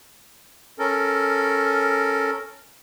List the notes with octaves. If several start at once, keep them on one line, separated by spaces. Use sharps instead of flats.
C#4 A4 A#4